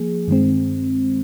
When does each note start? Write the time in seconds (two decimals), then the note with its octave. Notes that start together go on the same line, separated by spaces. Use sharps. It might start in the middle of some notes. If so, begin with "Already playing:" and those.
Already playing: F3 A#3 G#4
0.28 G2 D#3 G#3 C4